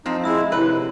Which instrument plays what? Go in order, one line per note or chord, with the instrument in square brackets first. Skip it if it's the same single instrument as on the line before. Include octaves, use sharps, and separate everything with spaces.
[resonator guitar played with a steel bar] F2 C4 [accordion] D#4
[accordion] G#3 E4 [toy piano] E5 E6
[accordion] C3 [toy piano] E4 C#5 [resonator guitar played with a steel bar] B4